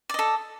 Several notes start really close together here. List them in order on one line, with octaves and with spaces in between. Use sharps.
D5 D#5 A4